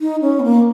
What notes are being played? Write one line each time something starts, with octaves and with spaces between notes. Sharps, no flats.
D#4
C#4
B3
A#3